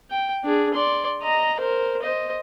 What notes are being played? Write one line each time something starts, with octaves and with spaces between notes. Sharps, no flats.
G5
D4 G#4
D5 C6
D#5 A#5
A#4 C5
C5 D#5